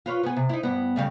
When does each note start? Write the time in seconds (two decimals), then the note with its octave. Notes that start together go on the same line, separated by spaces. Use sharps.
0.06 F4 B4 C#5
0.23 B3 G#4
0.37 C3
0.49 D#4 E4
0.63 G2 B3
0.96 A2 C#3 G3